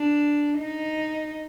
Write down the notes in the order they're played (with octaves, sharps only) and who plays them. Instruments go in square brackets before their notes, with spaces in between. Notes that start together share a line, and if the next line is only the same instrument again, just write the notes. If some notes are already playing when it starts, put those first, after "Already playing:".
Already playing: [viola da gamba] D4
D#4